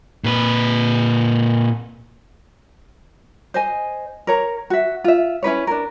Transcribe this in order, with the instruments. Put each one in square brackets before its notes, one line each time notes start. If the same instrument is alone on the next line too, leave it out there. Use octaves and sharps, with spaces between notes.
[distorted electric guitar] A#2 B4
[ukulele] C5 D#5 G#5
A#4 C#5 A#5
F#4 E5
F4 E5
C#4 E4 B4 C#5
D4 A#4